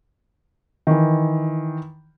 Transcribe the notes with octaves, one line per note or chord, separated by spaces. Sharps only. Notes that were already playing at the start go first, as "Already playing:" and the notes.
D#3 E3